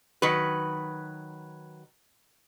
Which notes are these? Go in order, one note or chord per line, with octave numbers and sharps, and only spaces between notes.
D#3 F#3 B4